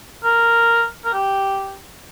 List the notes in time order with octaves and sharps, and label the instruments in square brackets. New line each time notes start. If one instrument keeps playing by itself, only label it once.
[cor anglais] A#4
A#4
G4